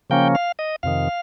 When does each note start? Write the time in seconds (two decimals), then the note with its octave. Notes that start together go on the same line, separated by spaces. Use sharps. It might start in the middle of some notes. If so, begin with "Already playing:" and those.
0.10 C#3 F3 A#3 C#4 G5
0.35 F5
0.59 D#5
0.83 F2 C3 D#3 F5